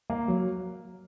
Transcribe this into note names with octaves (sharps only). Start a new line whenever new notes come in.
A#3
F#3